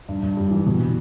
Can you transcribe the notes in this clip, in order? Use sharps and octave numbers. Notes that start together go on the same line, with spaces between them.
G2
G2
G3
E3
B2
E4